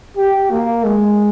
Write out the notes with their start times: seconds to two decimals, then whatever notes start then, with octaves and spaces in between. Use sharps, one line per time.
0.17 G4
0.51 A#3
0.84 G#3